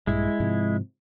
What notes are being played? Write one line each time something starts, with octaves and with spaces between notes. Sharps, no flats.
A#1 G2 G#3 E4
G#2 C3 F3